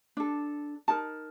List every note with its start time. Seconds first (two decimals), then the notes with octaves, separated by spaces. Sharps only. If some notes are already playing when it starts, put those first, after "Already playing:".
0.17 D4 A4
0.88 D#4 A#4 A5